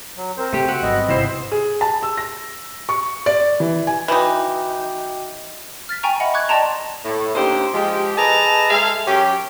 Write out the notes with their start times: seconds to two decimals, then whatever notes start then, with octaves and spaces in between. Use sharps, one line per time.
0.17 F#3
0.37 C4 A#4 C5
0.53 C#3 A3 G4 G5
0.69 F#4
0.82 G1 F#2 B3 C4 D#5
1.08 G#1 D#2 C3 E4 C5
1.52 G#4
1.81 A5
2.03 E6
2.17 A#6
2.89 C#6
3.26 D5
3.60 E3
3.87 G#5
4.08 E3 D#4 F#4 G5 D6
5.89 F6 A6 B6
6.03 G5 G#5 A#5 C#6
6.20 D#5 E5 F#5 G5 B5
6.34 C#6 D6 F#6 G#6
6.48 D5 D#5 G5 A5 A#5 C6
7.05 A2
7.35 D3 A#3 C#4 D#4 G4 C5
7.74 F3 G#3 G4
8.17 G#4 A4 B4 D#5 A5 A#5
8.71 G#3 G#4 A4 E5 F5
9.07 F#2 C#4 G4